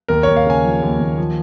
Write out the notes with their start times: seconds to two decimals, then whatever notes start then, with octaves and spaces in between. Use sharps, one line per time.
0.08 D#2 A#4
0.23 D#2 C#5
0.36 F5
0.46 C#3 G#5
0.64 F3
0.82 D#2
1.00 D#2
1.18 F3